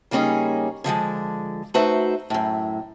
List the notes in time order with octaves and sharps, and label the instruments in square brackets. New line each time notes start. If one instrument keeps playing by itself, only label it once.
[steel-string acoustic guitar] C#3 G3 A#3 C#4 D#4 G#4
D3 F3 F#3 G#3
A3 D#4 F#4 B4 C5 E5
F#2 A2